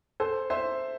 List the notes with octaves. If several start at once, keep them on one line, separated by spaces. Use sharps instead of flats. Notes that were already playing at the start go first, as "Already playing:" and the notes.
A4 C5
C5 E5